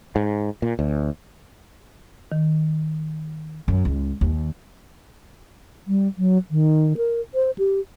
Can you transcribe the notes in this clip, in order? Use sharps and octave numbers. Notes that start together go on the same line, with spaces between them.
G#2
A#2
D2
D#3
F#2
C#2
D#2
G3
F#3
D#3
A#4
C5
G4